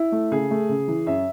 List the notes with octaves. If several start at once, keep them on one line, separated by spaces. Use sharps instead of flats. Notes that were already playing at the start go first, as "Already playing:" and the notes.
Already playing: E4
A3
C#3 G#4
A3
C#3
E3
F#2 E5